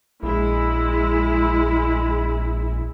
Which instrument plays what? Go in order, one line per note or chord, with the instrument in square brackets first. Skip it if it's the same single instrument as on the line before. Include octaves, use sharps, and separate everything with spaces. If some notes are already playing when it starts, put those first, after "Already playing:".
[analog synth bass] A#1 [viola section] G#3 E4